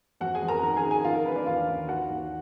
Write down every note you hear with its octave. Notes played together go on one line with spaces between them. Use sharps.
F2 F#4 F#5
G#4 G#5
F2
A#4 A#5
D#3 A#4 A#5
G#4 G#5
D#3
G#4 G#5
D#3 F4 F5
A#4
D#3 B4
D4 D5
D#2 F4 F5
D#2
D#3 F#4 F#5
D#2